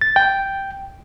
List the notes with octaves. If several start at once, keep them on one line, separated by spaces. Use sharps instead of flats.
A6
G5